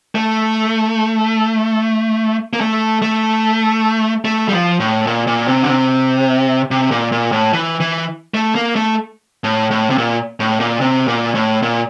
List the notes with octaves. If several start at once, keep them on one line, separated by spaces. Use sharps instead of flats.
A3
A#3
A3
A3
A3
G3
F3
A2
A#2
A#2
C3
D3
C3
C3
A#2
A#2
A2
E3
E3
A3
A#3
A3
A2
A2
C3
A#2
A2
A#2
C3
A#2
A2
A#2